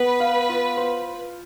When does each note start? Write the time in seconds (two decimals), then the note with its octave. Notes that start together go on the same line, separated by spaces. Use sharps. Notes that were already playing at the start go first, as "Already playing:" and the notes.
Already playing: B3 B4
0.20 F5
0.49 F4
0.77 C5